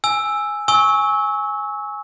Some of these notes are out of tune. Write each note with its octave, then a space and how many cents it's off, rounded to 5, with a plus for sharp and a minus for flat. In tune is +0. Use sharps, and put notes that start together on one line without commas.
G#5 +0 E6 +0
G#5 +0 C#6 +0 E6 -25